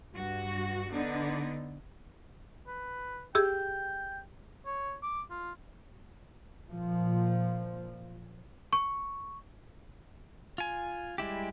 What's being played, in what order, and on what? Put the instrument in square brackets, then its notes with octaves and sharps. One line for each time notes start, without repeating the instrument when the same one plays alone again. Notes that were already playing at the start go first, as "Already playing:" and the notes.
[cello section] G2 F#4
D3 B3 D4 D#4
[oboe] B4
[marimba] G4 G#4 E6 [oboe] G5
[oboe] C#5
D6
F4
[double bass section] A#2 F3
[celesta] C#6
[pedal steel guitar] F4 G#5
G3 G#3 E4 G4